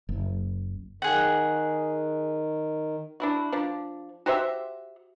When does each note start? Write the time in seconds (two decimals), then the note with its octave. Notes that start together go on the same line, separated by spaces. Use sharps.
0.09 F#1
1.02 D#3 G#4 F#5
3.20 D4 E4 F#4
3.52 F3 D4
4.26 F#4 G4 C5 E5